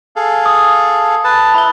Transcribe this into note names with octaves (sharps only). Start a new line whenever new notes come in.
G#4 A4 F5
D#6
B4 A5
E4 B5 G7